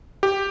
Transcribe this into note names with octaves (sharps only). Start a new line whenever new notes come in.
G4